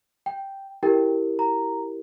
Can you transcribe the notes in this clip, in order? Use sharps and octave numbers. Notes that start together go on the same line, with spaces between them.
G5
E4 G4 A#4 G5
A#5